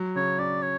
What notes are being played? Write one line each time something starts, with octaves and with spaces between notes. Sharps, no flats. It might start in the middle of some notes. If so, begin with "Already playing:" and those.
Already playing: F#3
C#3 C#5
C#4 D5
C#5